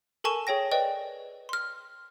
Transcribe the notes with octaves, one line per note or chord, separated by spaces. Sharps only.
A4 A#4 G#5 A5 C#6 E7
G#4 C#5 G5 A#6
B4 D5 D#5 G5
C6 F6